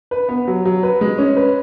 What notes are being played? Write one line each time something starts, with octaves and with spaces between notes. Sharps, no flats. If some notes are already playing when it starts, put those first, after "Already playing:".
B4
B3
F#3
F#3
B4
G#3
C#4
B4